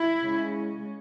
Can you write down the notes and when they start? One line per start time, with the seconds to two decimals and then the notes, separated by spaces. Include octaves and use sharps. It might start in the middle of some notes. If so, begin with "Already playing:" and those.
Already playing: E4
0.19 C#3 G#3 C#4